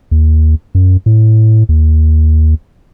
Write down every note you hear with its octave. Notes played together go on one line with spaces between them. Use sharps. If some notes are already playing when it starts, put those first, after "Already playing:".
D#2
F#2
A2
D#2